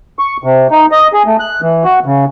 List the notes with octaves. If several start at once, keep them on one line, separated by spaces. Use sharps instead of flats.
C#6
C3
D#4
D#5
G#4
A3
F#6
E3
F#4
C#3